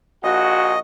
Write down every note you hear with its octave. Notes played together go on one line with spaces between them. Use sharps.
A#1 F#4 D#5